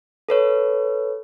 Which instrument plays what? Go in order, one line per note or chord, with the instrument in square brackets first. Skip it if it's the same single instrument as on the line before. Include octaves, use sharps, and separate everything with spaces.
[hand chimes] A4 B4 C#5